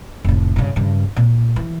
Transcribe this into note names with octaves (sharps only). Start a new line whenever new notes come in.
F1 A2
G2 C#3
G2 C#3
A#2
E3